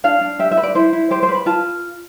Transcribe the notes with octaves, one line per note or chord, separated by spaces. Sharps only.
D4 F5
D4
G4 E5
E5
B4
D5
E4 C5
E4
G4 C5
C5
B4
B5
F4 A5